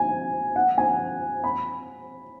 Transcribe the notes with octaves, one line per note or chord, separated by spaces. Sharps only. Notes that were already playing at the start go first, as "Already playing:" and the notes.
Already playing: G#5
F#5
G#5
B5